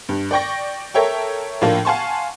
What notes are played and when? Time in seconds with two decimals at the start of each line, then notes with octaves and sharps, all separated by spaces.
0.09 G2
0.31 D5 G5 C#6 A#6
0.94 A4 A#4 C#5 E5 G5
1.61 A2 F3 A#3 D4 F4
1.85 F5 F#5 G#5 A5 C6 C#6